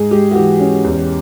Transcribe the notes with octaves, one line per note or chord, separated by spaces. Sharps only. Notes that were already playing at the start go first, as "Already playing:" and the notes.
Already playing: G#2 G#4
G#3 G4
F#4
E3 G4
C#4
E2